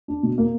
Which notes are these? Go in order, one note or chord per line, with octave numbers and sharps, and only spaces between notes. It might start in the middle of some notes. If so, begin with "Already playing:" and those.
D4
B2
A#3